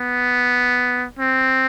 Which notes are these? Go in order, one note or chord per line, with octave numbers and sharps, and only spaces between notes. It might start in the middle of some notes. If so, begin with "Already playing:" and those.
Already playing: B3
C4